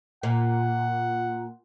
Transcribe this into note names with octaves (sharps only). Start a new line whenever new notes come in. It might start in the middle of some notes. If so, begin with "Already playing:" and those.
A#2 F#5